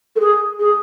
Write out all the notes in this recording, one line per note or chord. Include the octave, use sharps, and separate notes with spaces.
A4
G#4
G#4